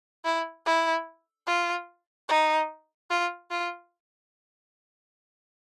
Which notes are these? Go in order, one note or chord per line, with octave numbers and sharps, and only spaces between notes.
E4
E4
F4
D#4
F4
F4